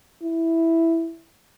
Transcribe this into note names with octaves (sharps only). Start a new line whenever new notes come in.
E4